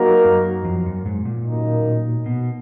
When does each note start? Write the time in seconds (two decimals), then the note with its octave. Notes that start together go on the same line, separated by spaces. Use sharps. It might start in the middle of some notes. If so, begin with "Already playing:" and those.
Already playing: F#3 A#3 D#4 F#4 A#4
0.25 F#2
0.64 F2
0.86 F#2
1.06 G#2
1.25 A#2
1.46 F#2 D#3 A#3 D#4
2.26 B2